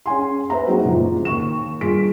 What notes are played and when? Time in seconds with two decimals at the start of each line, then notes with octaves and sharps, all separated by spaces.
0.06 C#4 G#4 G#5 C6
0.50 B4 C5 E5 A#5
0.67 F#3 G#3 A#3 C4 D#4 F#4
0.85 F#1 A#2 C#3 F3
1.25 D#2 C#6 E7
1.81 G2 F4 G#4 B6 D7